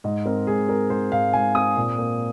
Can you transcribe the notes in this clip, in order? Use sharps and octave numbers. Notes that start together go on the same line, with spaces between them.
G#2 D#5
C4 A#4
G#2 G#4
C4 A#4
G#2 C5
G#2 F5
G#2 G#5
C4 D#6
A#2
A#3